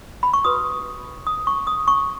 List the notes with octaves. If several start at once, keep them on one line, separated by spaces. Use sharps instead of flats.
B5
C#6
F#4 B4 D#6
D#6
C#6
D#6
C#6